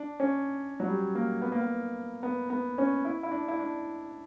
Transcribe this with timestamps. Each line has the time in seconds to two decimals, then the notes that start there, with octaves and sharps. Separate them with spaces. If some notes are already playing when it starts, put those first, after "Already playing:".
Already playing: D4
0.20 C#4
0.80 F#3
0.87 G3
1.15 A#3
1.42 B3
1.52 A#3
1.61 B3
2.23 B3
2.50 B3
2.78 C#4
3.05 E4
3.23 E4
3.31 D4
3.48 E4
3.59 D4